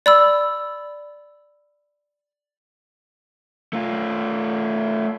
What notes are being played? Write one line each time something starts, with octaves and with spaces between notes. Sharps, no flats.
D5 B5 E6
A3 F4